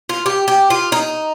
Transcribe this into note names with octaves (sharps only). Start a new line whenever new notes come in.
F4
G4
G4
F4
D#4